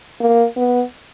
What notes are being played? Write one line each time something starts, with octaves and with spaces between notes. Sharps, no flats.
A#3
B3